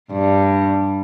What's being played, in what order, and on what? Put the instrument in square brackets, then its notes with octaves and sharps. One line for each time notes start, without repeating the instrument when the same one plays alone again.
[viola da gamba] G2